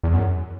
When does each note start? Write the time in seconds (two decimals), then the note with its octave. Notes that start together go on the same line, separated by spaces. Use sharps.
0.03 E2
0.14 F#2